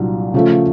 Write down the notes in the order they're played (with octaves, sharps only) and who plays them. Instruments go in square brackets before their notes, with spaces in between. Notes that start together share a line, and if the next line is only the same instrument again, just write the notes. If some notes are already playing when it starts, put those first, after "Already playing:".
Already playing: [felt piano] C2 A#2 F#3 D4
C#3 F3 A3